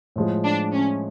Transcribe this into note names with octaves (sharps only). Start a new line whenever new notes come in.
A2 F3 G#3
D4
C#4